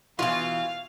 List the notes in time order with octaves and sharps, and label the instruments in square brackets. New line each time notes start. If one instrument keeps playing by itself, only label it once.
[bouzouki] B2 E3 [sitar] F4 [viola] F5